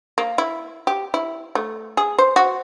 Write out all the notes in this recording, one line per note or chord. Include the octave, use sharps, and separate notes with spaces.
A#3
E4
G4
E4
A3
G#4
C5
F#4